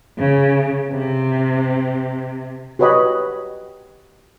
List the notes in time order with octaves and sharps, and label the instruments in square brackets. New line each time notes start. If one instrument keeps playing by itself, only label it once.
[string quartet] C#3
C3
[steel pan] F#4 G4 B4 C#5 D#5 B5